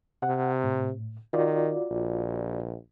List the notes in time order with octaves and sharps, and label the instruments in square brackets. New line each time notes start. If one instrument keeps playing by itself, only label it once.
[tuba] C3 [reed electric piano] F#5
[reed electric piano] A2
[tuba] D#3 [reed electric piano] F4 F#4 D5
[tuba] A#1